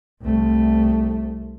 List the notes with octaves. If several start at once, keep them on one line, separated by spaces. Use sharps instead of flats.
C2 A3